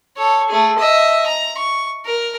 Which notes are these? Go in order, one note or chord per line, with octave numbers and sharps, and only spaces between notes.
A4 C#5
A3 G#4
D#5 E5
A#5
C#6
A#4